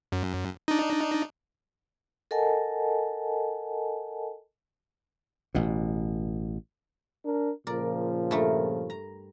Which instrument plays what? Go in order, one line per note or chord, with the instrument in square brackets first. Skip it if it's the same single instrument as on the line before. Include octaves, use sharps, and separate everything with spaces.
[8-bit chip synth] F#2
D4 D#4
[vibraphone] A4 A#4 D#5 F#5 G#5 A5
[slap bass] A1 B2
[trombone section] D4 A#4
[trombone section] A#2 C#3 F3 [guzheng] A#4 D5
[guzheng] G2 A3 A#4
A#5